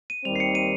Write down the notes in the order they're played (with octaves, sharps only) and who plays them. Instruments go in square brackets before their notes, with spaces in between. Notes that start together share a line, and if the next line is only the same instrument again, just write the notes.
[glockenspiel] D#7
[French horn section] D#2 D#3 G3 C4 [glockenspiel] F7
[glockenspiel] C7
C#7
D#7